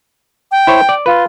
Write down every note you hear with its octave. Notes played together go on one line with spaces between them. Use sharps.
G5
E4 C5 C#5
D5
F4 B4